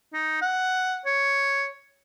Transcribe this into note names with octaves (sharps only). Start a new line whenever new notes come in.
D#4
F#5
C#5